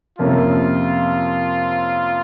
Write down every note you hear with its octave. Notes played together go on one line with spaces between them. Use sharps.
F2 C3 F3 A#3 C#4 F4